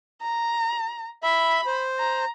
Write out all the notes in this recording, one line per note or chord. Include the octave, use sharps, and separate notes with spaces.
A#5
E5 B5
C5
A#5